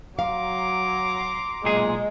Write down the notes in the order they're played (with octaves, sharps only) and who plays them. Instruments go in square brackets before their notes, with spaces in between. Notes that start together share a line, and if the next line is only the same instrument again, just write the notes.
[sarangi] F#3 [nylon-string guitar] F5 [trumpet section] A#5 C6 D6
[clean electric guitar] B1 A#2 G#4 [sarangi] G#3